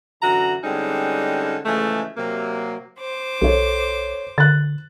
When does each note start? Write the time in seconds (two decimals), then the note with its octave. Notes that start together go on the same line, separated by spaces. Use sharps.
0.23 F#2 D3 E3 F#4 A#5
0.64 D3 G3 G#3 C4 C#4 D#4
1.66 C#3 E3 F3 G#3 A3
2.17 C3 F#3 A#3
2.99 C5 D6
3.42 B1 A4 C#5
4.38 D3 F#6 A6